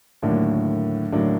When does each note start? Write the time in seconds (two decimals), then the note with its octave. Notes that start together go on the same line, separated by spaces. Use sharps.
0.22 D#2 A2 D3 F#3 A#3 D4
1.12 A2 D3 F#3 A#3 D4